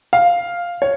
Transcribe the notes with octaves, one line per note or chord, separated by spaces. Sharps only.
F5
C#5